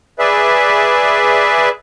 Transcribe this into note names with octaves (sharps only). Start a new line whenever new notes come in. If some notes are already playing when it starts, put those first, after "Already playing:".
G#4 B4 D5 E5